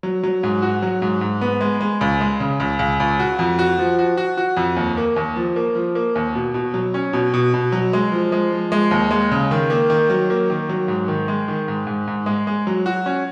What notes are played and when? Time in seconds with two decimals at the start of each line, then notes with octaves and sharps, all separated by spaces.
0.03 F#3
0.23 F#3
0.43 G#2
0.62 F#4
0.82 F#3
1.02 G#2
1.21 G#2
1.41 B3
1.61 G#3
1.81 G#3
2.01 C#2
2.21 G#3
2.40 C#3
2.60 C#2
2.79 C#2
3.00 C#2
3.19 F#4
3.39 F2
3.59 F#4
3.79 F3
3.99 F#4
4.17 F#4
4.37 F#4
4.57 F2
4.76 D#2
4.97 A#3
5.16 D#2
5.36 F3
5.56 A#3
5.75 F3
5.95 A#3
6.15 D#2
6.35 B2
6.54 B2
6.74 F#3
6.94 C#4
7.13 B2
7.34 B2
7.54 B2
7.72 F#3
7.93 G#3
8.12 F3
8.32 G#3
8.52 F3
8.72 G#3
8.91 D#2
9.11 G#3
9.31 C#3
9.51 D#3
9.70 A#3
9.90 D#3
10.10 F#3
10.30 A#3
10.50 D#3
10.69 F#3
10.88 G#2
11.08 D#3
11.28 G#3
11.48 D#3
11.68 G#2
11.87 G#2
12.08 G#2
12.26 G#3
12.47 G#3
12.67 F#3
12.86 F#4
13.06 C#4